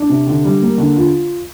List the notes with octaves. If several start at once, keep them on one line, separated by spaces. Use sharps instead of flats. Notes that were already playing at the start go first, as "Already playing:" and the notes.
Already playing: D4
C3
D3
G3
A#3
D3
F4